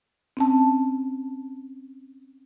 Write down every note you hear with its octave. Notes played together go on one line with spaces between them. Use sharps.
C4 C#4 A5